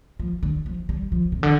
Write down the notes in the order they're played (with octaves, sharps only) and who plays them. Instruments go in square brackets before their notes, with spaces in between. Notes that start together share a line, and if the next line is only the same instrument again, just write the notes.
[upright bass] F3
D3
F3
G3
F3
C3
D3